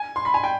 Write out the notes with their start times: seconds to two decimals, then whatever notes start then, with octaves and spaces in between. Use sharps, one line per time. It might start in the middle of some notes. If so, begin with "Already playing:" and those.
Already playing: G#5
0.16 C6
0.25 B5
0.34 G#5
0.44 G5